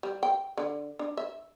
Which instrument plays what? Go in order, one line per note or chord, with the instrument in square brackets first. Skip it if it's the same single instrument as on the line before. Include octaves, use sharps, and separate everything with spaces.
[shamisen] G3
G5
D3
D4
E5